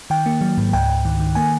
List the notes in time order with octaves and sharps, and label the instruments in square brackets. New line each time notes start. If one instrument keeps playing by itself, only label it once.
[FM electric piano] D#3 G5
A#3
F#3
G#2
C#2 G5
C#2
D#3
D#3
A#3 G#5